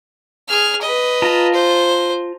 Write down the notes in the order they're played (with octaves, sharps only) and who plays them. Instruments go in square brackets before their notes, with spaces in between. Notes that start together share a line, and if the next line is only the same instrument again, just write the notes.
[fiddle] G#4 F6
B4 D#5
[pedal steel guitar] F4 A5 A#5
[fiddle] C5